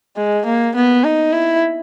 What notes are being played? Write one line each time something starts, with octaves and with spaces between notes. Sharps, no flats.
G#3
A#3
B3
D#4
E4